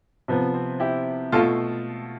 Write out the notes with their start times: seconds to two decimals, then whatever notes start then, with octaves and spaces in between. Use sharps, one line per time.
0.28 C3 F3 B3
0.54 C4
0.80 E4 G4
1.32 B2 A3 F4 A4